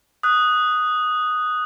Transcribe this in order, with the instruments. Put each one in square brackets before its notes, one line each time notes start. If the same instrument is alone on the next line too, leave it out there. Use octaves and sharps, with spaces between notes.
[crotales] D#6 F#6